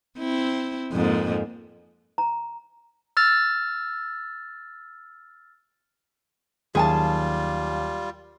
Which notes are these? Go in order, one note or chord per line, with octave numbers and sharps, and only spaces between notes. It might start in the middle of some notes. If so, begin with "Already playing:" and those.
C4 E4
F2 G#2 A#3
A#5
E6 F6 A6
D#2 F#3 G3 F4 G#4 G#5 A5